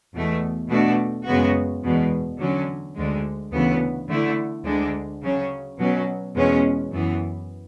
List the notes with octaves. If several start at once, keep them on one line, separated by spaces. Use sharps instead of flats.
E2 B2 A3
B2 A3 D4 F#4
F#2 C#3 G#3 B3 F#4
E2 B2 G#3
D3 F#3 C#4
D2 D3 G#3
D2 C#3 E3 B3
D3 A3 E4
D2 D3 G#3 D4
C#3 F#3 C#4
B2 F#3 C#4
E2 B2 G#3 C#4
F#2 E3 B3